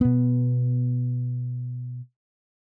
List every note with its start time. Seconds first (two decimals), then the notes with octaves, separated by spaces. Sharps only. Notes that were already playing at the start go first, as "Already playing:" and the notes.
0.01 B2 B3